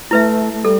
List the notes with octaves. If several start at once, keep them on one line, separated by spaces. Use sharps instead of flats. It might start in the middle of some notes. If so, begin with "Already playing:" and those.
A3 E4 B4 E5
A3
G3 A4